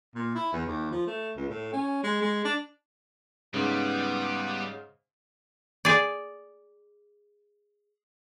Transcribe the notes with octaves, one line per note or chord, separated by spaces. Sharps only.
A#2
E4
E2
D#2
F3
A3
C#2
A2
C#4
G#3
G#3
D4
G#2 C#3 G3 B3 B4 D#6
G#4 D5